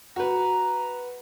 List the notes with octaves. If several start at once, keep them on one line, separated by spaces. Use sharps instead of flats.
F#4 B4 A#5